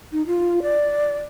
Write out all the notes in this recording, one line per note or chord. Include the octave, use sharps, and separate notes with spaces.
D#4
F4
D5